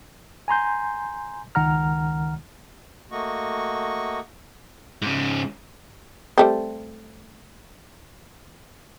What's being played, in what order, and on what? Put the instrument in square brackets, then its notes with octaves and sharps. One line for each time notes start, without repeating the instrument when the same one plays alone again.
[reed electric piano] G#5 A#5 C6 G6
C#2 D#3 F#5 A#5 F6
[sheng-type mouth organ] A3 A#3 F#4 D#5 C#6
[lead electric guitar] G#2 C#3
[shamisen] G3 A3 C4